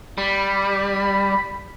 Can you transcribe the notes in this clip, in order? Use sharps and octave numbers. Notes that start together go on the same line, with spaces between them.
G3 B5